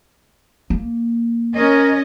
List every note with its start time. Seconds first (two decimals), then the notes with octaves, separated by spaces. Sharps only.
0.70 A#3
1.56 C#4 A#4 D#5